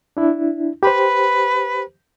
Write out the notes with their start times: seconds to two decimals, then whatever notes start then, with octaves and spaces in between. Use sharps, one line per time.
0.17 D4 E4
0.83 G4 B4 C5